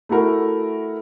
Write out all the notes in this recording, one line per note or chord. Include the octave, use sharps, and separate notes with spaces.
A3 E4 F#4 A#4